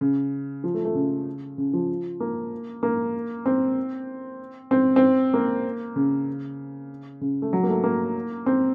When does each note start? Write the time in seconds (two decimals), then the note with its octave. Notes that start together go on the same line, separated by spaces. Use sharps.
0.01 C#3
0.64 F3
0.74 A3
0.85 A3
0.95 C#3
1.58 C#3
1.73 F3
2.20 A#3
2.83 A#3
3.46 C4
4.71 C4
4.96 C4
5.34 A#3
5.96 C#3
7.21 C#3
7.42 A3
7.53 F#3
7.63 A#3
7.68 A3
7.84 A#3
8.46 C4